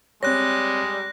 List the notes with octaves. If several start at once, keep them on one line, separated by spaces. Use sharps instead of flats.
G3 G#3 C4 C#5 F#6 A#6